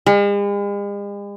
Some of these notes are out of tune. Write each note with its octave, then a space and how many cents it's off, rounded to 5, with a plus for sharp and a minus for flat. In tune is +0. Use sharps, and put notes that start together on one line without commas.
G#3 -45